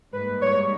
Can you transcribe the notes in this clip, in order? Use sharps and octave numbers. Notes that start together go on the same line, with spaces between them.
G#2 G3 A#3 B4
C#5